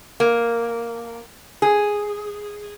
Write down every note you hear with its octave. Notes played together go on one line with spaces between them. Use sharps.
A#3
G#4